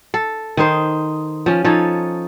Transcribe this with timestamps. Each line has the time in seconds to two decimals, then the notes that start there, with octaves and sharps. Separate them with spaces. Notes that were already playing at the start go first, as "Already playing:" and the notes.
0.14 A4
0.57 D#3 D#4 C5
1.46 F3 C#4
1.65 F3 D#4 A4 C#5